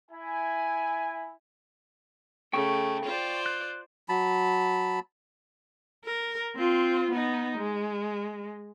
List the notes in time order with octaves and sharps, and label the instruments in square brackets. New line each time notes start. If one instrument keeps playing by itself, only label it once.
[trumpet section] E4 G#5
[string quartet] C#3 A3 [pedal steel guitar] G5 C#6
[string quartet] F4 C5 D5
[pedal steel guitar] F#6
[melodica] F#3 A5 B5
[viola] A#4
C4 F4
B3 D#4
G#3